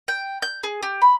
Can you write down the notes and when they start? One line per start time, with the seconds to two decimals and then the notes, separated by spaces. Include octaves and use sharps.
0.08 G5
0.42 G6
0.63 G#4
0.83 G4
1.02 B5